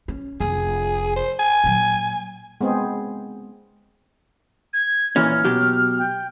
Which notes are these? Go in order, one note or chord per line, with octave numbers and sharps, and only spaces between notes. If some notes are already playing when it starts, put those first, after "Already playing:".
C#4
F1 G#4
C5
G#5
A#2 F#3
G#3 B3 C4 G#4
G#6
A#2 E3 C#4 F6
B2 F#3 G4
G5